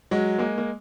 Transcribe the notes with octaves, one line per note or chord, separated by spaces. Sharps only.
F#3 G#3
G#3 A#3
A#3